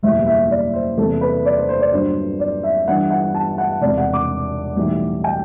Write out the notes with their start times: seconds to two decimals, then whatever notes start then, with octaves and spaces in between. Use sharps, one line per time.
0.03 F#1 E2 B2 G3 E5
0.26 E5
0.51 D5
0.74 C5
0.98 E2 C3 E3 G3 A4
1.21 B4
1.45 D5
1.57 C5
1.69 C5
1.81 D5
1.92 G1 G2 D3 F#3 C5
2.40 D5
2.63 E5
2.88 G1 G2 E3 G3 F#5
3.10 F#5
3.34 A5
3.58 F#5
3.81 E1 E2 C3 D5
3.98 F#5
4.13 D6
4.76 B1 A2 E3 G3
5.24 G5